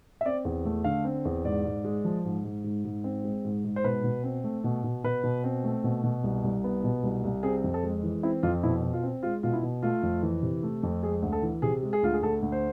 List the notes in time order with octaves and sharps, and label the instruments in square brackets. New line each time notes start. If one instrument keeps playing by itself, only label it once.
[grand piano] E5
C4 D5
E2
A3
D3 F5
C4
E2
G#2 D5
G#2
G#3
F3
G#2
G#2
G#2
G#2
C4
G#3
G#2
G#2
C5
B2 B4
B2
C4
A3
B2
B2
B2 B4
B2
C4
A3
B2
B2
C2
C2
B3
B2
C2
C2
C4 G#4
F2
A4
G#3
E3
C4 E4
F2 F4
B2 E4
B2
F4
C4
G#3 F4
B2 F4
E4
B2
A3 F4
F2
E3
C3
A3
F2
G#3 G#4
D2
A4
E3
C3 G#4
G#3
G#4
D2 F4
G#4
D2 A4
D2
C5